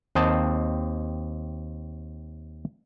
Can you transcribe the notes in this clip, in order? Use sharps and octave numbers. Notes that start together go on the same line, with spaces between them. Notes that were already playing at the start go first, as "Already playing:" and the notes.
D#2 C4 D#5 A5